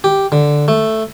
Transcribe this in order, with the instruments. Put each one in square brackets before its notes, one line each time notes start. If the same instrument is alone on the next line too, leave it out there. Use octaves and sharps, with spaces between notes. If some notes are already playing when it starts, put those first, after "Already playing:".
[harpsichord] G4
D3
A3